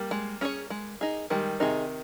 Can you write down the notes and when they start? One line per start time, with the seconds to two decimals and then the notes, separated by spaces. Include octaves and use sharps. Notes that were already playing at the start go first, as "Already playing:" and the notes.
Already playing: G3 A#3
0.11 G#3
0.41 C#4 G#4 C#5
0.70 G#3
1.01 D#4 G#4
1.30 D#3 G3 G#3
1.60 C3 D#3 D#4 G#4